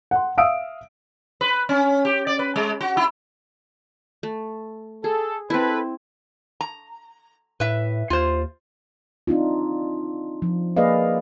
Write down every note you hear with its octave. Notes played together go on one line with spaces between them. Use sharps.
F#5 C6
E5 F5 D#6 E6 D7
B4
C#4
G4
D5
B4
G#3
F#4
E4
A3
G#4 A4
C4 E4 A4 B4
A#5
A2 B4 E5
D#2 F4 C5
C4 D4 D#4 F4
F3
A#3 G#4 B4 D5 D#5 F5